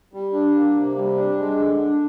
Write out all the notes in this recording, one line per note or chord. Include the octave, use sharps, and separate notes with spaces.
G3
D4
A#3
C3
G3
D4
G#3
D3
D4